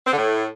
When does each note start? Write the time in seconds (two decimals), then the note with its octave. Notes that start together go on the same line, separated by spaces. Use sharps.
0.06 C4
0.11 D3
0.16 A2